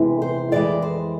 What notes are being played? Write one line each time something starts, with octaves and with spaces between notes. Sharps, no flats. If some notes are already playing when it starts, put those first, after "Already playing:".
Already playing: E2 C3 E3 G#3
C5
F2 E3 G#3 D5
C5